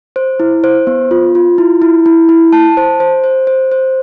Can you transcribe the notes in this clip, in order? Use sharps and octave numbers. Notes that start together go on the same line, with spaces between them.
C5
E4
C5
B3
F4
F4
E4
E4
E4
E4
A5
C5
C5
C5
C5
C5